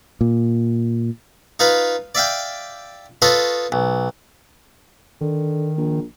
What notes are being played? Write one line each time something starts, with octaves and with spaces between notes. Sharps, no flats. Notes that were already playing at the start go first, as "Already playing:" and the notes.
A#2
D#4 F4 B4 F5
D5 E5 F5 G5
F4 A4 B4 C#5 D#5 F5
B1
D3 D#3
A#1